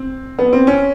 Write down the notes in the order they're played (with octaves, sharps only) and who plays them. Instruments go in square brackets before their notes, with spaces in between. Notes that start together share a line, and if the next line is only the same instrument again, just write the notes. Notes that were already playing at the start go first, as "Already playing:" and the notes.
Already playing: [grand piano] C4
B3
C4
C#4